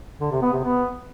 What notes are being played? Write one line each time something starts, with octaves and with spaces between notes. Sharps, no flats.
D3
C3
B3
C3
B3